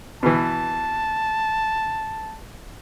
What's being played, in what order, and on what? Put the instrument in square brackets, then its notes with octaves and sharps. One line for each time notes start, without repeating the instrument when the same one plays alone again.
[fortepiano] B2 E3 [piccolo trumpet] A5